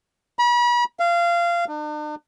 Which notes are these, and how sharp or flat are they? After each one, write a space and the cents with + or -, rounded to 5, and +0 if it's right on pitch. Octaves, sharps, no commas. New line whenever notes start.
B5 -40
F5 -20
D4 +45